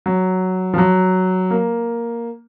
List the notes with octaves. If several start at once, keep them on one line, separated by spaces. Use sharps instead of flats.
F#3
F3
F#3
A#3